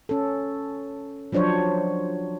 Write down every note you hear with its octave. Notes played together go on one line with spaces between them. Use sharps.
C#4 A4
F3 F#3 D4 C5 C#5